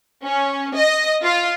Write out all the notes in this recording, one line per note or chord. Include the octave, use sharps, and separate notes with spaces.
C#4
D#5
F4